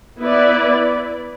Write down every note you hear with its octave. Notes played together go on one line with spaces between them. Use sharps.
B3 E4 B4 D5